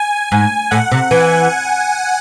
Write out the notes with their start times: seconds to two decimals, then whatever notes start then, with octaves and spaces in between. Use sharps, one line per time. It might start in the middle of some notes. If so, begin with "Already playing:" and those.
Already playing: G#5
0.32 G#2
0.71 A2 F#5
0.92 C3
1.11 E3 G#5